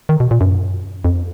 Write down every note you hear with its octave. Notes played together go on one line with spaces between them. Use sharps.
D#3
B2
A#2
F#2
F2